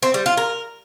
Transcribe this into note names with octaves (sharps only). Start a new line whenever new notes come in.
C4
G3
F4
A#4